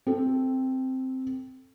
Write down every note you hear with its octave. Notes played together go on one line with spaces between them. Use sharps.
C4 A4